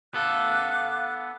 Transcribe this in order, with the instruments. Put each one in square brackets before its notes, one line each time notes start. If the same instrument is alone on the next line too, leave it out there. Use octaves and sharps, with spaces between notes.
[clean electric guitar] B3 A4 [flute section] F5 D6 F#6